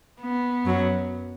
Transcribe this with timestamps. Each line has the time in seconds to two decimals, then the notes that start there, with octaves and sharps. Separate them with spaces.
0.21 B3
0.65 F#2 F#3